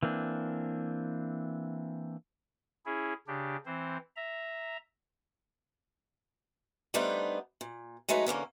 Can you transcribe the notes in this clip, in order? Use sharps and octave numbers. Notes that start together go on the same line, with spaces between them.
E3 A#3 C4 D4
C#4 E4 G#4
C#3 D4 G4
E3 C4 C5
E5 A#5
G3 A3 B3 D4 D#4 C5
A#2
F#3 G#3 A3 D#4 B4
E2 D3 A#3 C#4